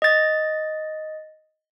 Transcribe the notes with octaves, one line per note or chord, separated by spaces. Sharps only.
D#5 A6